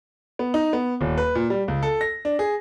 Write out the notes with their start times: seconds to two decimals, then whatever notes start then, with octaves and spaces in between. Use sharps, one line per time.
0.39 B3
0.54 D#4
0.73 B3
1.01 D#1
1.18 B4
1.35 A#2
1.50 G3
1.68 C#2
1.83 A4
2.01 A#6
2.25 D4
2.39 G#4